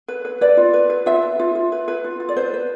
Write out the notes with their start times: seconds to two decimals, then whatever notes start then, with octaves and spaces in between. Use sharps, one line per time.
0.08 B4
0.25 B4
0.41 B4 D5
0.57 F4
0.73 B4
0.90 B4
1.06 F4 E5
1.22 B4
1.39 F4
1.55 F4
1.72 B4
1.88 B4
2.04 F4
2.20 F4
2.29 D5
2.37 B4 C5
2.54 B4